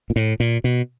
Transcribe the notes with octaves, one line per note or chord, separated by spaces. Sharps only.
A#2
A2
A#2
B2